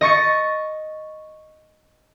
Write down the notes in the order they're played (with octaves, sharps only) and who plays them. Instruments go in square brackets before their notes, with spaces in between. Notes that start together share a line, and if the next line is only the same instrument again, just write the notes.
[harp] D#5 C#6 A6 C#7